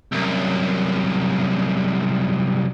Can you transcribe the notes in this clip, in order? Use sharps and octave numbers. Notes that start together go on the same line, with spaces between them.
C2 F#2